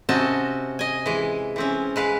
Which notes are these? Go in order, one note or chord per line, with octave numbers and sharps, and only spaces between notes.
C3 C4 C#4 F#4 D#5 A5
D#5 G#5
E3 G#3
E3 C4 C#4
G#3 B4 F5